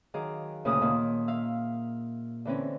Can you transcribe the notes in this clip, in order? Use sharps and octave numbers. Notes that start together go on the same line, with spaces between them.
D#3 F#3 G#4 F5 A#5 D6
D2 A#2 C#3 F5 A5 D#6
A#2 D#3 A#3
E5 F5 E6
D3 E3 C4 C#4